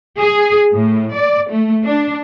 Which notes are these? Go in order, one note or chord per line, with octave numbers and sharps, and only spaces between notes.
G#4
A2
D5
A3
D4